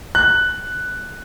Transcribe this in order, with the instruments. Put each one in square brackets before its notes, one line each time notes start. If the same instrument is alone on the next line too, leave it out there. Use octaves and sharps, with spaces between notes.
[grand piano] F#6